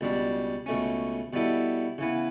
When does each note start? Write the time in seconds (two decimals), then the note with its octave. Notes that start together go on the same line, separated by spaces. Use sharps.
0.01 C#2 B2 G3 D4
0.66 C#2 B2 A3 C#4
1.33 B2 G3 B3 E4 A4
1.98 C#3 E3 B3